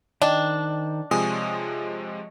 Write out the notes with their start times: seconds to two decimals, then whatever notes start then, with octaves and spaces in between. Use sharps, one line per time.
0.22 D#3 D4 C5 D#5 G5
1.11 C3 F3 G#3 C#5 D#5 G#5 D#6